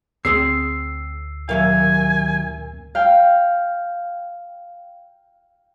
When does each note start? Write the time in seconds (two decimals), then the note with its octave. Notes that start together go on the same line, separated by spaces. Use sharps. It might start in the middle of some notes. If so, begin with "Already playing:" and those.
0.25 D2 C4 G#4 C6 E6 C7
1.49 D#2 A#2 F#3 A#4 E5 F5 G#5
2.95 F5 G5